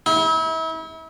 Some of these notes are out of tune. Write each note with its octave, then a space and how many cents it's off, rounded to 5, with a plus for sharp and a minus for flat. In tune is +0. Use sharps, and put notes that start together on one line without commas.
E4 -35